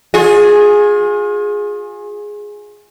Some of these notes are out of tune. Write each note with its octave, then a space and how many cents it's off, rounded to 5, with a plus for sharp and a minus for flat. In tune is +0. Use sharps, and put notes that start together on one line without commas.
F4 +40 G#4 +0